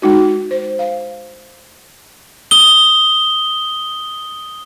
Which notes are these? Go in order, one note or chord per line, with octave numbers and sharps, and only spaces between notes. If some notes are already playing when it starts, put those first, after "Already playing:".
G#3 D#4 F#4
C5
F5
D#6 G7